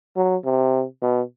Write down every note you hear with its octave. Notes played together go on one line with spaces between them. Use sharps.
F#3
C3
B2